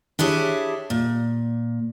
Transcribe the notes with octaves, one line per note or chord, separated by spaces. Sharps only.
D4 E4 G4 G#4 C#5
A#2